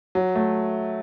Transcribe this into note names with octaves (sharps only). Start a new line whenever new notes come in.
F#3
A3